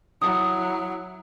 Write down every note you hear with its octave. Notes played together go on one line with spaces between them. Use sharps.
F#3 E4 D#6